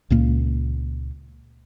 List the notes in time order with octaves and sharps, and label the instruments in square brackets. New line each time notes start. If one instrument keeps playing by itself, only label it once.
[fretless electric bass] C#2 A#2 A#3